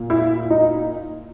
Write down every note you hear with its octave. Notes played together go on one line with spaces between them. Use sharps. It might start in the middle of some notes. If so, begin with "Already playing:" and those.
Already playing: A#2
E4
D#4